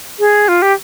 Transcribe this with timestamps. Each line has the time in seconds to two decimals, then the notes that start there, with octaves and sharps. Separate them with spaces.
0.19 G#4
0.48 F4
0.62 G4